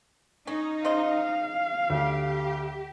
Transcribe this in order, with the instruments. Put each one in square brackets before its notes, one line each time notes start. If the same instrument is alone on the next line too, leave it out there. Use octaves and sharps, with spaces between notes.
[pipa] C#4 [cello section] D#4
[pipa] C#3 C5 D#5 [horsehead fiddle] F5
[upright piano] D2 [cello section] G4